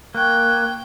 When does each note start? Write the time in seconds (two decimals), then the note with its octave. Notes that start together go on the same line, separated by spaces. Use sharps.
0.15 A#3 G5 C#6 F#6 G#6